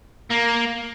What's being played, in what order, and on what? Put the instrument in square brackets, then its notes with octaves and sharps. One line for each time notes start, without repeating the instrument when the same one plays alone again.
[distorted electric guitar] A#3